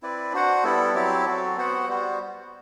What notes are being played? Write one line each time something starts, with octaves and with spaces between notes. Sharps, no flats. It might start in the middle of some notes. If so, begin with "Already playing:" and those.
C4 E4 B4 D5
D4 F#4 C5 F#5
G3 B3 E4 A4
F#3 C4 E4 G4
F#3 C4 F#4 A4
B3 F#4 C5 F#5
G3 B3 F#4 C5